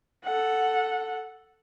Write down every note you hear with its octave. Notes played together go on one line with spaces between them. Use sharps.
A4 F#5